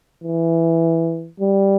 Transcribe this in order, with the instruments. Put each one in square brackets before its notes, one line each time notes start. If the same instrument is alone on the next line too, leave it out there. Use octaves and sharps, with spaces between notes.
[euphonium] E3
G3